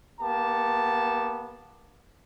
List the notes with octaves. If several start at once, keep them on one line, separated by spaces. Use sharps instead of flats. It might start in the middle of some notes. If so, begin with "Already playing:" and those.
A#3 B3 G4 A5